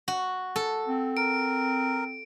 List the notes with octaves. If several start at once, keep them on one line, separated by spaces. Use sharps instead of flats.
F#4
A4
C4
A#4 D7